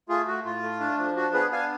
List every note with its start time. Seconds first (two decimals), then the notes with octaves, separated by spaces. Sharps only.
0.09 A3 F4 G#4
0.27 A2 F#4
0.45 A2 F4
0.63 A3
0.80 D4
0.98 F3
1.16 D4 F#4
1.34 B3 G#4 B4
1.52 D4 F5 G#5